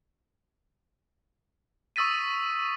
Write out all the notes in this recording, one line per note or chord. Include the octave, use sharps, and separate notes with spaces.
C#6 D#6 E6 A6 B6 D#7